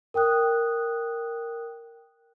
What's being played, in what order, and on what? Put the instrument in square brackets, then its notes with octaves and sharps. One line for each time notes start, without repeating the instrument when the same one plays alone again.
[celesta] A#4 G5 D#6 F#6